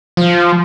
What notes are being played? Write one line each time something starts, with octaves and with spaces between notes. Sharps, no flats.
F3